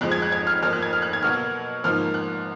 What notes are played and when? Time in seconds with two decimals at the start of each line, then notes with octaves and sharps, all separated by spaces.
0.01 F2 F3 G#3 F#6
0.11 G#6
0.22 F#6
0.32 G#6
0.47 F6
0.63 F2 F3 A#3 F6
0.72 F#6
0.82 G#6
0.93 F6
1.02 F#6
1.13 G#6
1.23 B2 F#3 A#3 F6
1.84 G#2 F3 A#3 F6
2.14 F#6